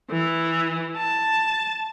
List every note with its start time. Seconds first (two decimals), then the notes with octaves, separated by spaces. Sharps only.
0.10 E3
0.97 A5